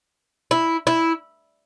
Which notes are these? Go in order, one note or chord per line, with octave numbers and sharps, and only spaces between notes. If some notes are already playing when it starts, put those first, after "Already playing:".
E4
E4